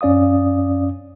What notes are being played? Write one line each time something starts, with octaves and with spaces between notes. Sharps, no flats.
F#2 C#4 D5 F5 D#6